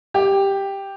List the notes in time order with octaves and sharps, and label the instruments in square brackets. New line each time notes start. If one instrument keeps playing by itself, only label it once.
[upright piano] G4